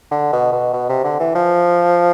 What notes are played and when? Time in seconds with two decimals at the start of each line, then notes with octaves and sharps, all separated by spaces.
0.11 D3
0.33 B2
0.52 B2
0.73 B2
0.89 C3
1.04 D3
1.20 E3
1.35 F3